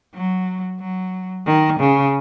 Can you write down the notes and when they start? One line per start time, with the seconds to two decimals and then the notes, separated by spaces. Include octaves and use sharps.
0.15 F#3
0.80 F#3
1.46 D#3
1.80 C#3